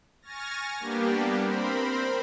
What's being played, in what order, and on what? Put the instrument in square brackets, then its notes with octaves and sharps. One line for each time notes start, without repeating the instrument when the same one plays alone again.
[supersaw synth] G#5 C#6 F6 A6 A#6
G3 A#3 B3 D4 G4
C4 A#4 C5 B5